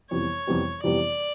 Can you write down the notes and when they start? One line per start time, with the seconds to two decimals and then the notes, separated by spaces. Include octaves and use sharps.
0.11 F2 C3 E3 G3 B3 C#5
0.47 F2 C3 E3 G3 B3
0.83 F2 C3 E3 G3 B3 D5